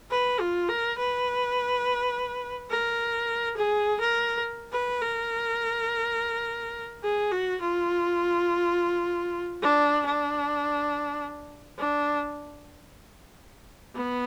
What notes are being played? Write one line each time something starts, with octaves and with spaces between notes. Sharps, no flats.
B4
F4
A#4
B4
A#4
G#4
A#4
B4
A#4
G#4
F#4
F4
D4
D4
D4
B3